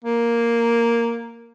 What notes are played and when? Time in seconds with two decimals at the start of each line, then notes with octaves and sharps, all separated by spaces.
0.04 A#3